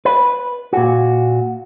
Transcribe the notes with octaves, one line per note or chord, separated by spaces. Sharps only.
B4
A#2 F#4